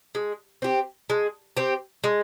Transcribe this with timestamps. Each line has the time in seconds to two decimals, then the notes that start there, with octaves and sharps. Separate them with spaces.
0.15 G#3
0.62 C4 G4
1.10 G#3
1.57 C4 G4
2.04 G#3